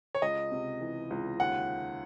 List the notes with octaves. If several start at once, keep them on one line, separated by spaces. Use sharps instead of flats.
C#5
C#2 D#5
C3
E3
C#2
D#2 F#5